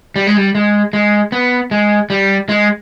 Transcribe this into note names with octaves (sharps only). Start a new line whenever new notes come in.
G3
G#3
G3
G#3
G#3
B3
G#3
G3
G#3